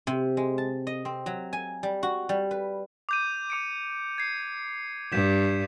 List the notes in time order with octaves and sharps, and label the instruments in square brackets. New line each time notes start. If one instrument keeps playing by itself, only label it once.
[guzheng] C3
G#3
A5
D#5
C4
F#3
G#5
G3
F#4
G3
B4
[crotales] D6 G6 D#7
D6 C#7 D7
G#6 C7
[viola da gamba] G2 [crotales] G6 B6 E7